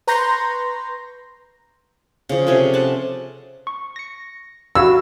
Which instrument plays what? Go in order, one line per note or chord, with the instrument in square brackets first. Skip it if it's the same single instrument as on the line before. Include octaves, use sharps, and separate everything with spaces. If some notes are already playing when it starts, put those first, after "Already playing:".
[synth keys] B4 A#5 C6 C#6 G6 A#6
[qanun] C#3 F3
C3 C#4 G#4 A4
F#5 A5
[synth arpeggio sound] C#6
A#6 C#7
[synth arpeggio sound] F#4 F5 B5 [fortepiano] E6